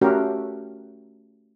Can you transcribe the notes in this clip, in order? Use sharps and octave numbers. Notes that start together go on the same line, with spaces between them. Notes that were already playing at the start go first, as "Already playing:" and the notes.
A3 C#4 F#4 G4 A#4